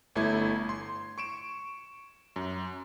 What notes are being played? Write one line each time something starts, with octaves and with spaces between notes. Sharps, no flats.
G1 A3 E4 G#6
C6
C#6 D7 E7
F#2